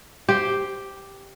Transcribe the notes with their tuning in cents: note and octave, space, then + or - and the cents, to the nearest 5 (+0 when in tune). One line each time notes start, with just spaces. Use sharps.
G4 +0 C5 +0